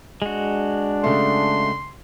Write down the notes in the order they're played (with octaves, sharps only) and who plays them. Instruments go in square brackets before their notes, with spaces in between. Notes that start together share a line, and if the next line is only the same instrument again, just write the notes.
[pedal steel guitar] G#3 F#4 [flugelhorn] D4
[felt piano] C#3 A3 [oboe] C6